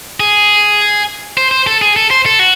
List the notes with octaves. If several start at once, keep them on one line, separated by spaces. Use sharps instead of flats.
G#4
C5
C5
A4
G#4
A4
C5
A4
F#4